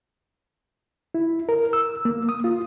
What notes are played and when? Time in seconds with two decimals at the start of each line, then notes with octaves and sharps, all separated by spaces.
1.14 E4
1.49 A#4
1.73 E6
2.05 A#3
2.29 D#6
2.44 F4